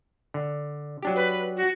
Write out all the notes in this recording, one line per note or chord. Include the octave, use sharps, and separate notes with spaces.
D3
F#3 D4 G4
B4
F#4